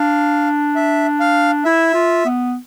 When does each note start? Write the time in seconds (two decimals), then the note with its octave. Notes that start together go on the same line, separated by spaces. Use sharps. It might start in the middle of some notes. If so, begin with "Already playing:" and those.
Already playing: D4 F5
0.76 E5
1.20 F5
1.65 E4 E5
1.94 F4
2.25 B3